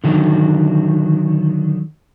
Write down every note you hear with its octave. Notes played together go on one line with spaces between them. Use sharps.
D3 D#3 F#3